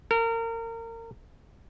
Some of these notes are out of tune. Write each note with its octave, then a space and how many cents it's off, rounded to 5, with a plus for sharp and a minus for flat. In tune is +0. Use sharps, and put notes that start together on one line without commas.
A#4 -30